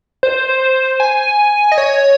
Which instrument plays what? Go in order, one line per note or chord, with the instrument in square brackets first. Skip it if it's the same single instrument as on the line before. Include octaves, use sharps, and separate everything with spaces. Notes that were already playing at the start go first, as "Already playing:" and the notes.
[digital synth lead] C5
G#5
D#5
C#5